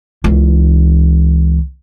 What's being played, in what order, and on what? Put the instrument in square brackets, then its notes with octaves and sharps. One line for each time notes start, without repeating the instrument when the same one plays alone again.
[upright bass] C#2 E3